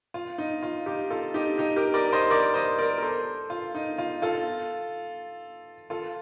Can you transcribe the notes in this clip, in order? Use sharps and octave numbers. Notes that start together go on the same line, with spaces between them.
F4
D#4
F4
D#4 G4
F4 A4
D#4 G4
D#4 G4
G4 A#4
A#4 D5
C5 D#5
A#4 D5
C5 D#5
A#4 D5
A#4
A4 C5
F4
D#4
F4
F4 A4
F4 A4